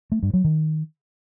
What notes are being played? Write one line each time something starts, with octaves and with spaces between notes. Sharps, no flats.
A3
G2
F#3
D#3